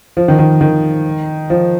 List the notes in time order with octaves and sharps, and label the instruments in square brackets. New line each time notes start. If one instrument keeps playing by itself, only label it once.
[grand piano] F3
D#3
D#3
D#3
F3